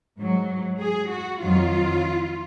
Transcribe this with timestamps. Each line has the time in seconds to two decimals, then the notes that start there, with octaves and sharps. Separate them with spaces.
0.18 G#2 F#3
0.80 G#4
1.11 F#4
1.42 F2 D#3 F#3 F4